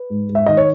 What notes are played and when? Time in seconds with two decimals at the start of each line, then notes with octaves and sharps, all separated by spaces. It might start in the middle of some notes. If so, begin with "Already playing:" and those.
Already playing: B4
0.10 G#2
0.29 G#2
0.35 E5
0.46 D#3 D#5
0.57 C#5